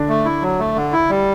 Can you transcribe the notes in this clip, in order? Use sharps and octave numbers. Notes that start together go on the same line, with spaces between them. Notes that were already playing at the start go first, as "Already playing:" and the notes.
Already playing: D3 D4
A3
E4
F#3
A3
D3
E4
G3